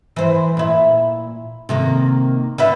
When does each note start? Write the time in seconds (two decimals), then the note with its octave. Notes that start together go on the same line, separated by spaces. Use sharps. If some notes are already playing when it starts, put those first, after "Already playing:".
0.16 E3 C5
0.57 A#2 E4
1.69 C3 D#3 A#3
2.58 D3 B4 E5